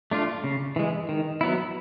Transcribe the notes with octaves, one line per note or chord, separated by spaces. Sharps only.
A3 D4 F4
C#3
E3 G#3
D#3
F#3 B3 E4